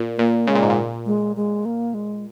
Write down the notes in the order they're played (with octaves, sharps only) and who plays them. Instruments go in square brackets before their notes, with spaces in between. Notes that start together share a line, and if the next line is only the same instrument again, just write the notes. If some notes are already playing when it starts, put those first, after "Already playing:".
Already playing: [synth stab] A#2
[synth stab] A#2 [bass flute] A#3
[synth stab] C#3 [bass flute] G#3
[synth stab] A#2
G#2
A#2
[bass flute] G#3
G#3
A#3
G#3